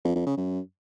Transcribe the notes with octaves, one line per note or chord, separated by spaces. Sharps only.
F2
F2
C#3
F#2